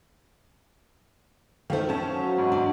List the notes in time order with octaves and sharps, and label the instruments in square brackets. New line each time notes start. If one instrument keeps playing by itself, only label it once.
[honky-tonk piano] D#3 A3 [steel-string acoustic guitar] C5 E5 F5
[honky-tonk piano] C#4 A5
[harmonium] F#3
[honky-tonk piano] G#2
[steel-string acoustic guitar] D4